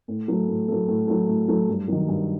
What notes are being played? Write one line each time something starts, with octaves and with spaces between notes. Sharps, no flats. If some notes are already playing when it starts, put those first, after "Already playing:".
A2
F#3 A3
A2
F#3 A3
A2
F#3 A3
A2
F#3 A3
G2
D#3 F#3
G2